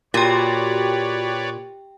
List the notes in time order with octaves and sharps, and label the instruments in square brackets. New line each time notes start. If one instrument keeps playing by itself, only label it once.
[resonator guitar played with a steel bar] A#2 [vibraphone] F#4 B5 [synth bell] G4 G5 [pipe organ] B4 C#5 D5